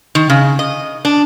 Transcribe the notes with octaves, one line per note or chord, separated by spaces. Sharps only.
D#3
C#3
D#5
D4